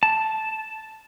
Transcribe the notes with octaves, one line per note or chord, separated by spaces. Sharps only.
A5